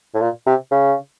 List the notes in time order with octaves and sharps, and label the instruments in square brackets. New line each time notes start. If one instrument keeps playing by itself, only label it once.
[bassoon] A2
A#2
C3
C#3